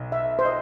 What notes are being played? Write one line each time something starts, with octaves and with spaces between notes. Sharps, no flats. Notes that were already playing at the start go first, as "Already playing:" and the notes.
Already playing: B1
E5
C5
D#5